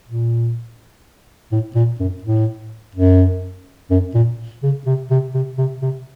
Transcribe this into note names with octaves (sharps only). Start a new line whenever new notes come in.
A#2
A2
A#2
F#2
A2
F#2
F#2
A#2
C#3
C3
C3
C3
C3
C3